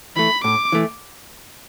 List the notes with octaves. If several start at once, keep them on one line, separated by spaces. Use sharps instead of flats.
E3 A3 B5
A2 D6
E3 A3